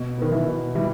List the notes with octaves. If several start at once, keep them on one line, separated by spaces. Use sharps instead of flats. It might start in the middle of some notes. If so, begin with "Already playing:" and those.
Already playing: B2
D#3 B3
E3
B2
E3 G3